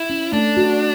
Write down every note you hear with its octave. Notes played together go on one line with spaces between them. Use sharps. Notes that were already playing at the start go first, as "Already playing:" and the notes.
Already playing: E4
C#4
A3 D4
F#4